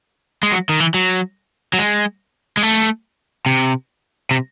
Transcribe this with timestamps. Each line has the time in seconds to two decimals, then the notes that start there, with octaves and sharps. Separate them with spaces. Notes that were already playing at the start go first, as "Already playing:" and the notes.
0.43 G#3
0.52 F#3
0.69 D#3
0.80 E3
0.94 F#3
1.73 F#3
1.79 G#3
2.57 G#3
2.63 A3
3.46 C3
4.31 C3